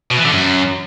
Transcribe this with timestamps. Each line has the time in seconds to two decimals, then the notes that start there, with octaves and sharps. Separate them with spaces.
0.11 B2
0.18 E3
0.25 D3
0.32 F#2